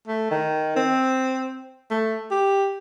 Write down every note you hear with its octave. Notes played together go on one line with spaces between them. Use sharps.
A3
D#3
C4
A3
G4